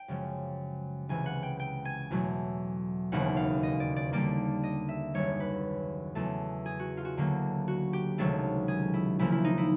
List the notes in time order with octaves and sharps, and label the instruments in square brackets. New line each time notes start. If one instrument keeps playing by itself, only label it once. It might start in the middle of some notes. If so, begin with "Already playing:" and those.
Already playing: [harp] G5
F#2 C#3 F3 G#3
C#2 C3 E3 G#5
F#5
G5
G5
G#5
E2 B2 F#3 A3
E1 D#2 C#3 E3 F#5
F5
D#5
D5
D5
D#2 D3 G3 A#3 D5
D#5
E5
F#1 F#2 D#3 G3 C#5
B4
E2 C#3 F#3 A3 A4
G#4
F#4
F4
F#4
D2 D3 F#3 A#3
F#4
G4
C#2 C3 D#3 F#3 A3 A4
G#4
E4
D2 C#3 F3 A#3 E4
E4
D#4
E4